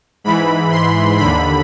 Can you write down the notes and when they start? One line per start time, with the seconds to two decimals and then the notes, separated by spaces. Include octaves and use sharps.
0.24 G#2 E3 B5
0.71 C6
1.18 D#2 D3 B5